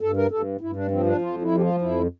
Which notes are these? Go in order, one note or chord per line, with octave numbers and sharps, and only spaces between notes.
G2 A4
A#4
G2 A4
G2 E4
D4
F3 C4
D4
F2 F4
E4
F3
G4
F4
F2 E4